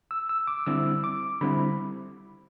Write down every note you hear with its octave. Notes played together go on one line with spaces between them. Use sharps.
E6
E6
D6
D3 G3 C4 E4 E6
D6
D3 G3 C4 E4 B5